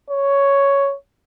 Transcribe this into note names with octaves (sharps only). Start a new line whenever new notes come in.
C#5